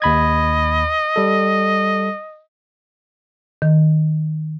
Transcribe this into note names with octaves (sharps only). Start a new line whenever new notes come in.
D#2 D#5 B5 G#6
G3 A4
D#3